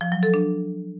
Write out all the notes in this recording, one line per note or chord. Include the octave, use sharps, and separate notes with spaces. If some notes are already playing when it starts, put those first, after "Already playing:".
F3
F#3
A4
D4